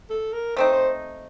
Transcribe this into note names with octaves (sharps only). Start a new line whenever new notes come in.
A4
A#4
A3 C4 D#4 C5
C5